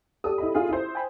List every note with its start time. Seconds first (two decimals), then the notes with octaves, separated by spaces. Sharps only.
0.24 G4 A4 D5 D#6
0.38 E4 D#5 B5
0.54 F4 G#4
0.69 E4 C5
0.95 G5 G#5 B5